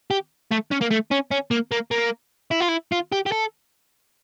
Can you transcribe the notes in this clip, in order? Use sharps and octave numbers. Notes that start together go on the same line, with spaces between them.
G4
A3
C#4
A#3
A3
C#4
C#4
A#3
A#3
A#3
E4
F4
E4
F4
G4
G4
A4